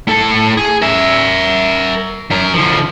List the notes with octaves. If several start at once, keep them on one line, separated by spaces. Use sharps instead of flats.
A2 A4
G#4
A#4 E5
F#2 A#4
D3 F3